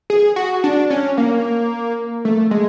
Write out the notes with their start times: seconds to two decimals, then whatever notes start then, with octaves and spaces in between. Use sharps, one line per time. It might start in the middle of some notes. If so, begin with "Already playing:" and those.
0.10 G#4
0.36 F#4
0.64 D4
0.90 C#4
1.18 A#3
2.25 A3
2.51 G#3